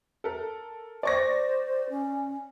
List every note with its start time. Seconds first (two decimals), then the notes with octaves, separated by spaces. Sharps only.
0.24 A4 A#4
1.03 C5 D5 C#6 A#6
1.90 C#4